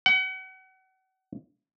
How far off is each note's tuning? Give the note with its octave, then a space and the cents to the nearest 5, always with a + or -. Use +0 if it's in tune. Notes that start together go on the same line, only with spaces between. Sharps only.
F#5 +35